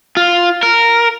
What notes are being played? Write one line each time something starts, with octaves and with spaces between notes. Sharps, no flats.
F4
A#4